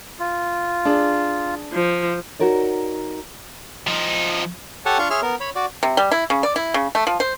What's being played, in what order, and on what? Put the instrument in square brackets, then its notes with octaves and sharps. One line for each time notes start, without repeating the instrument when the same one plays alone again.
[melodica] F4
[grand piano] D4 G#4
[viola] F3
[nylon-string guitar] D#4 F#4 A#4 C#5 D5
[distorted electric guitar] F3 D#4
[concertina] G4 A4 C#5 F#5 G#5 A5
D4 F4 F5 C#6
G#4 C#5 E5 C6 F6
B3 A#4
C#5 B5
F#4 D5
[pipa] C3
G3
E4
C#3
D5
E4
C#3
A3
F3
C5